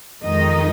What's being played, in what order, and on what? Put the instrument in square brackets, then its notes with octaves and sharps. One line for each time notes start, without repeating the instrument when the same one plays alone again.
[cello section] F2 D#3 G#3 D#4 D#5